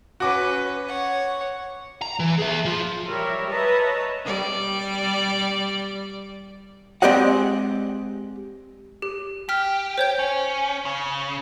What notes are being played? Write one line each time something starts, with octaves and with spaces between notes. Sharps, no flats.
C#4 F#4 B4 D6
C#5 F#5
A#5
E3
G#4 E5
F3 F4
G3 A#4 C#5 E5
B4 C#5 D#5 E5 A5 A#5
G3 D5
G#3 C4 G4 D5 D#5 F#5
G4
G4 F6 B6
C5 C#5 G6
C#4
C#3